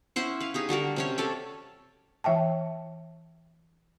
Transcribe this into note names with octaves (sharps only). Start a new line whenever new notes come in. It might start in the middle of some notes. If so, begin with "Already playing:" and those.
C#4 E4 C5 F#5
B4 F5
D#4 G4 G#4
D3 G3 F#4 A#4
C3 C#4 C#5
A4 C#5 D5
E3 E5 G5 A5